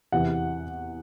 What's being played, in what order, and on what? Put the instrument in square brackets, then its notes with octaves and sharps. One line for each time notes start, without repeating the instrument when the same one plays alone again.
[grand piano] E2 C3 E3 F#5